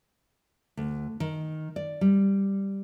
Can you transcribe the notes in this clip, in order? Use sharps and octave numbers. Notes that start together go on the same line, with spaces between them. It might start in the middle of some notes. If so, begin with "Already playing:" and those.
D2
D#3
D5
G3